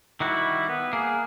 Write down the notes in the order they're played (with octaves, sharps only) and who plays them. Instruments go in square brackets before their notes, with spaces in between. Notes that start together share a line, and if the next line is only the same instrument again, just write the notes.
[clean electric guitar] D#3 G3 F#4 [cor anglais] E4
[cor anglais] B3
[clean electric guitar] A#3 [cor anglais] G#4